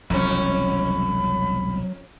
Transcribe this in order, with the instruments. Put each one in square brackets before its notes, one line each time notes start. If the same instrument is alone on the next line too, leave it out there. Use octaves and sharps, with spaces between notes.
[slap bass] E1 C2 [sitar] F2 C#4 [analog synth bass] F#3 [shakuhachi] B5